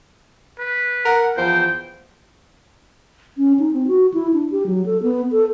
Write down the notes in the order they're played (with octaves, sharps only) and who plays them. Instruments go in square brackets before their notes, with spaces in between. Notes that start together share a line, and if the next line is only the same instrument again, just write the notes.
[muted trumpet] B4
[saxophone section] A#4 F#5
[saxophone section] E2 F3 C5 [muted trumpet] G5
[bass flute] C#4
D#4
C4
F#4
E4
D4
G4
F#3
A4
B3
A4